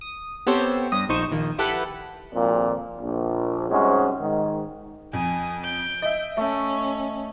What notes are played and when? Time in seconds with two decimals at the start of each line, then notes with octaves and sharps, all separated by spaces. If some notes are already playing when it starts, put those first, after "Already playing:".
0.01 D#6
0.47 B3 C4 G4 A4 C5 C#5
0.92 G2 D#6 A#6
1.09 A#1 D#4 C5 C#6 D#7 E7
1.32 A#1 D#3 A#3
1.58 E4 G4 A4 B4 F#5 B5
2.34 G#1 F2 A#2
3.00 A#1
3.70 G#2 C3 G3 G#3 C#4 F#4
4.20 G#2 D#3
5.13 F2 G#5 D#6
5.65 G6 D7
6.02 D#5 E5
6.37 A3 C#4